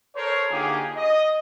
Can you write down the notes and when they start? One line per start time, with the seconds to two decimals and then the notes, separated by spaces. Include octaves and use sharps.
0.15 A4 A#4 C5 C#5
0.50 D3 A#3 D#4 F4 G4 G#4
0.96 D#5